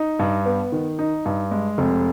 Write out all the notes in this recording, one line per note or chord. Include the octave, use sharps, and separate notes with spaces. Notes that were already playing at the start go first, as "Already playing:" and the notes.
Already playing: D#4
G2
B3
D#3
D#4
G2
G#3
F1